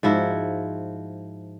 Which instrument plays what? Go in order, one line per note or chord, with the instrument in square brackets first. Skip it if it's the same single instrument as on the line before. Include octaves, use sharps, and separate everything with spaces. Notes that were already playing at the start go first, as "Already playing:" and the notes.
[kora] G#2 F3 E4 F#4